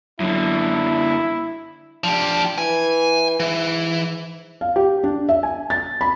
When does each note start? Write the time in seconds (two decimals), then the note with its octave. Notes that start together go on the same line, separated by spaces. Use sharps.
0.20 F#2 D3 E4
2.04 F3 D4 G4
2.58 E3 G#5
3.40 G#2 E3
4.61 F5
4.76 G4
5.04 D4
5.29 E5
5.43 G#5
5.70 A6
6.01 B5